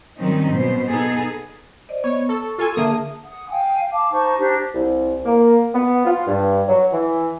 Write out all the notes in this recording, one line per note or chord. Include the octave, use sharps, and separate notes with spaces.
D#3 F#3 G3 C4 C#4 D#4
B2 C5
B3 D#4 G#4 A4
C5 D5 D#5
B3 C#5
A4 C#6
F4 A4 G#5
D3 A#3 G#4 E5 A5 D#6
F#5 D#6
F5 G5 G#5
F5 A5 D6
D#4 C5 A5 C#6
D4 D#4 G4 C5
C2
A#3
B3
F4
G2
F#3
E3